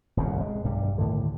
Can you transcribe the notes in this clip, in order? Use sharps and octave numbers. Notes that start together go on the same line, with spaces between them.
D#1 C2 F#2 C#3
G#3
B1 G2 G3
D#2 A2 D3